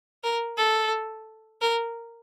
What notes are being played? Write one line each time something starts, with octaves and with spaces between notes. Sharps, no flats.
A#4
A4
A#4